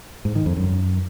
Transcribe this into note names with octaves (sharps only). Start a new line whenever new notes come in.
G#2
D#3
F2
F#2